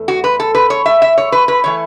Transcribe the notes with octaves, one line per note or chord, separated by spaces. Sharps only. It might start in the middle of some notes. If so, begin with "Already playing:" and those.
Already playing: E2 A3
F#4
B4
A4
B4
C#5
E5
E5
C#5
B4
B4
E3 A3 C#5